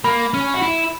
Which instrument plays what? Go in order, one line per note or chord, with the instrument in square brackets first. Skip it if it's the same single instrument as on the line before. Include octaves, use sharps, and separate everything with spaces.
[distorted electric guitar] A#3 [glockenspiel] B5
[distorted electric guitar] C#4
F#4
E4